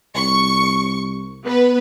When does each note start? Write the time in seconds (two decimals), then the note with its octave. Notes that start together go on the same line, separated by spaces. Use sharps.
0.16 C2 C#6
1.45 B3 B4